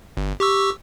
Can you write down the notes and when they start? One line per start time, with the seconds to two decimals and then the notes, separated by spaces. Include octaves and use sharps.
0.17 G1
0.40 G4 C#6 E6